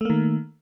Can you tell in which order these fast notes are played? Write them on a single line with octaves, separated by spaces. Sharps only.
A3 A#3 D#3